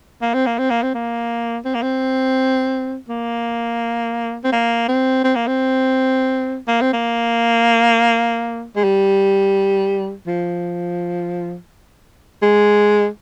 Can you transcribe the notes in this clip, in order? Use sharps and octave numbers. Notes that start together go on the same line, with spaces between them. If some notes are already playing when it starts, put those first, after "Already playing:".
A#3
C4
A#3
C4
A#3
C4
A#3
C4
A#3
C4
A#3
C4
A#3
C4
C4
A#3
C4
A#3
C4
A#3
G#3
G3
F3
G#3